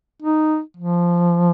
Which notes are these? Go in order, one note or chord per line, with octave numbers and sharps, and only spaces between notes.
D#4
F3